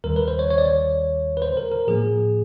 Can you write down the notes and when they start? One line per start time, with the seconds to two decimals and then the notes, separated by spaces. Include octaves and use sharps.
0.04 D#2 D#3 G3 A#4
0.16 B4
0.28 C5
0.39 C#5
0.51 C#5
0.58 D5
0.65 C#5
1.37 B4
1.42 C5
1.57 A#4
1.72 A#4
1.87 A2 F3 A#3 G#4